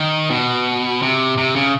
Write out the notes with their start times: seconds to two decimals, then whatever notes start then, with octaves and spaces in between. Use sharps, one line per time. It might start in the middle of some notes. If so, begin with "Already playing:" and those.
Already playing: D#3
0.30 B2
1.02 C3
1.38 C3
1.55 C#3